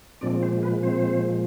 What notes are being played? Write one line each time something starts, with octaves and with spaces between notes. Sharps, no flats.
A#2 F3 G#3 C4 D4 D5
C4 C5
B3 B4
C4 C5